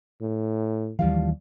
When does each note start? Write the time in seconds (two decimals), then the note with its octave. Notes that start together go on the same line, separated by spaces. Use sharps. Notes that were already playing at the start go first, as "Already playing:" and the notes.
0.21 A2
0.99 D#2 E3 F3 G3 F5